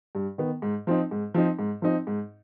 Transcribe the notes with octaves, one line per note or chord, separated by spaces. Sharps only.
G2
D#3 B3
G#2
F3 C4 D#4
G#2
F3 C4 D#4
G#2
F3 C4 D#4
G#2